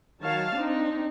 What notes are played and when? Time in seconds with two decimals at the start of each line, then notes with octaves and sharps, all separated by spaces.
0.22 D#3 F#3 C#5 F5 A5
0.57 C4 D4 D#4